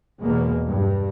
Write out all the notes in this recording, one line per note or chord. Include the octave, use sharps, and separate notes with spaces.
E2 B2 G#3 A#3
G2